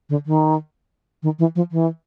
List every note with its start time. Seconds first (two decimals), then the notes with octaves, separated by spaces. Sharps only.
0.09 D3
0.26 D#3
1.23 D#3
1.39 E3
1.56 F3
1.72 E3